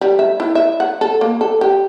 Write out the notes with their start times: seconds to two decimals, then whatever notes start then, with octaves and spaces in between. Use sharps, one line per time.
0.01 G3
0.19 E5
0.40 E4
0.55 E5
0.80 F#5
1.01 A4
1.21 A#3
1.41 A4
1.61 G4